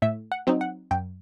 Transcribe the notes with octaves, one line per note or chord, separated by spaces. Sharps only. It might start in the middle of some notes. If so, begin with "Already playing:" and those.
A2 E5
F#5
F#3 C4 D#4
F#5
F#2 G5